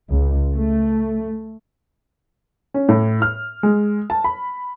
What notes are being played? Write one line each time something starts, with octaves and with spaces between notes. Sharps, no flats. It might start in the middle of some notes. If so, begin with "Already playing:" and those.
C#2
A3
C#4
A2
F6
G#3
A5
B5